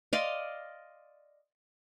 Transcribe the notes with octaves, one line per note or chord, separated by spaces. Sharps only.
D5 D#5 F5 C6